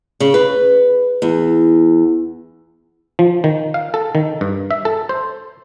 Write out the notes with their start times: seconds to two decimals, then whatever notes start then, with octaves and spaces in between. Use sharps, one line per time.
0.20 C#3
0.34 B4
1.22 E2
3.19 F3
3.44 D#3
3.74 F5
3.94 A4
4.15 D#3
4.41 G2
4.71 E5
4.85 A4
5.09 C5